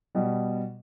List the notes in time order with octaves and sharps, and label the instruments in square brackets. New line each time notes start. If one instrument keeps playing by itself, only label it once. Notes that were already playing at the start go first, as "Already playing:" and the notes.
[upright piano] B2 G3